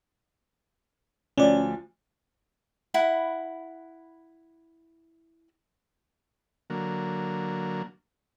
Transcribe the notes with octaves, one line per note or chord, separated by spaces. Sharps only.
D2 F3 C#4 D5
E4 F#5 B5
D3 F#3 A#3